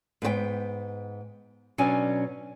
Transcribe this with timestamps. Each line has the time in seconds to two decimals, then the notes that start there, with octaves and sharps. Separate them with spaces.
0.22 G#2 B3 C5 G5
1.78 B2 F#3 C#4 D4 D5 G#5